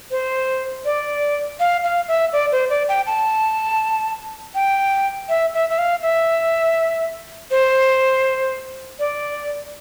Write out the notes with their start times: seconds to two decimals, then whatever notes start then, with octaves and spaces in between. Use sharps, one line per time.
0.11 C5
0.85 D5
1.60 F5
1.84 F5
2.08 E5
2.33 D5
2.52 C5
2.70 D5
2.89 G5
3.07 A5
4.55 G5
5.29 E5
5.54 E5
5.70 E5
5.78 F5
6.03 E5
7.51 C5
8.99 D5